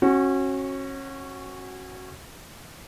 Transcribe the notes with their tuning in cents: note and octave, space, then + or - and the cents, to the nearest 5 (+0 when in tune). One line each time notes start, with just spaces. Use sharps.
C#4 -30 F#4 +0